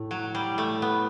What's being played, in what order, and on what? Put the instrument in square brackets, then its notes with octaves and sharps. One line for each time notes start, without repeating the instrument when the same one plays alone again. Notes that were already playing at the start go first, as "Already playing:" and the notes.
Already playing: [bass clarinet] A2 [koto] A3
[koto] F#3
G3
A3
B3